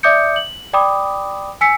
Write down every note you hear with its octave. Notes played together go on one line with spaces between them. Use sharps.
D5 E5 D6 D#6 G6 C#7
F#7
D5 G5 B5 D6 D#6
G#5 E6 B6 C#7